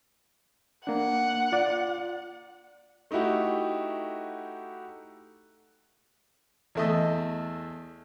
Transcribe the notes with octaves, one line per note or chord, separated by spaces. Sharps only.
A#3 D4 F#5
F4 D5
A3 D#4 E4 F#4 G4
E2 A3 D#5